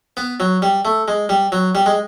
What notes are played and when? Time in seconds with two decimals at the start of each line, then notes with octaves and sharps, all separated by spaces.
0.17 B3
0.40 F#3
0.62 G3
0.85 A3
1.08 G#3
1.29 G3
1.52 F#3
1.75 G3
1.86 G#3